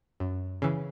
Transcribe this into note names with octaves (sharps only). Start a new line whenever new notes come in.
F#2
C#3 E3